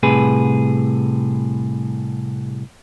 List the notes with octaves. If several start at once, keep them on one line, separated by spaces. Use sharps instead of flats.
C2 A2 C3 G#4 B4